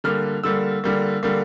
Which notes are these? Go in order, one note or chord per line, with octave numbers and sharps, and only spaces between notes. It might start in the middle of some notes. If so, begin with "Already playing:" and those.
D3 G3 A#3 F6
D3 G3 A#3 E6
D3 G3 A#3
D3 G3 A#3